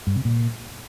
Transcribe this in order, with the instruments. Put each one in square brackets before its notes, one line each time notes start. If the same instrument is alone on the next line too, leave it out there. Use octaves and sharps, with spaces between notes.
[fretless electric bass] G2
C3
A#2